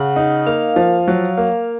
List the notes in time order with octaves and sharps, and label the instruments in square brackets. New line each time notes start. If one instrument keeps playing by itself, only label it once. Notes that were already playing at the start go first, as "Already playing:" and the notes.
Already playing: [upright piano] C#3 [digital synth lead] F#5
[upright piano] D#4
[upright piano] A#3 [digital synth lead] F5
[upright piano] F3
F#3
A#3